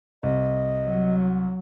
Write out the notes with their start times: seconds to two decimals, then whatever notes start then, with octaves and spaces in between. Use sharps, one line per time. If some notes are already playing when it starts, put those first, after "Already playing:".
0.23 C2 D#5
0.88 F#3